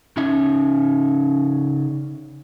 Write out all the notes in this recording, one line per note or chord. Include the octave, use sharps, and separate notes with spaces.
C#3 C#4 D#4 E5